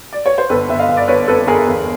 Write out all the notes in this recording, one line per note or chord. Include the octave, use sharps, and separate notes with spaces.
D5
C#5
C5
G1 A4 B4
G1 E5
D#5 F5
G1
D5
G1 B4 C#5
F2 A4 B4
G1 G#4 A#4
E2